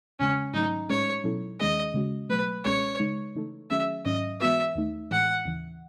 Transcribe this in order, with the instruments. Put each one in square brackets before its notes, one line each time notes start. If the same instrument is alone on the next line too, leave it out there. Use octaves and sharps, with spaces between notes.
[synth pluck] E2 C#3 G#3 [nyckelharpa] C#4
[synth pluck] G#2 D#3 F#3 A3 [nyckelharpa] D#4
[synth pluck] A2 G#3 C#4 G#4 [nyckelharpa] C#5
[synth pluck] B2 F#3 C#4 E4 A4
[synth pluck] D#2 D#3 G#3 C#4 G#4 [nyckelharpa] D#5
[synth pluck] C#3 G#3 C#4 F#4
[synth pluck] B2 F#3 A3 [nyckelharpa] B4
[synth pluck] C#2 B2 G#3 C#4 G#4 [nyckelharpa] C#5
[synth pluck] C#3 G#3 D#4
C#3 E3 A3 D#4 A4
[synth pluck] D#3 F#3 A3 C#4 G#4 [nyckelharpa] E5
[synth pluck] G#2 D#3 F#3 C#4 [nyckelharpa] D#5
[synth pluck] E3 G#3 B3 F#4 B4 [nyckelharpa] E5
[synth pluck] D#2 D#3 A3 D#4
[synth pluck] A2 E3 G#3 [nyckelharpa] F#5
[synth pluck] D#2 C#3 E3